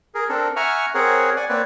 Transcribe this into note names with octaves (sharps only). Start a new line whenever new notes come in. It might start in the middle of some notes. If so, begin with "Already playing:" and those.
G#4 A#4
C4 D4 A4 A#4
E5 F#5 G#5 A#5 C#6 F6
C4 G#4 A#4 C#5 F#5
D5 F#5 G#5
A#3 C4 B4 C#5 D5